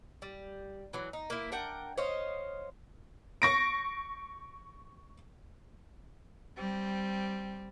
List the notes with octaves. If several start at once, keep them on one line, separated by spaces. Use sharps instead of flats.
G3
E3 F#3
D#4
A#3 E4
D4 A#4 F#5 G5
C5 C#5 D#5 F5
C#6 A#6 D7
G3 C4